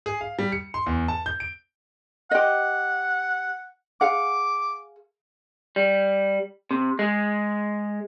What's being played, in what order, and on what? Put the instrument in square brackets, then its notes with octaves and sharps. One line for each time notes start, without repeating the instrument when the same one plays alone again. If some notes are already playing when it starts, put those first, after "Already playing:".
[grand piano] G#4
F5
G3
C#7
C6
E2
A5
G6
D7
[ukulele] G4 D#5 [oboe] F#5
[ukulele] G#4 F5 F#5 [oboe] D6
[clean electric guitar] G3
C3
G#3